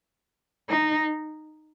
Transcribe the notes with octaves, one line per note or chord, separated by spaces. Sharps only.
D#4